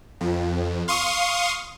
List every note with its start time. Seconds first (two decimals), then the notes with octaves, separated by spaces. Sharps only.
0.21 F2
0.88 F5 C6 C#6 D#6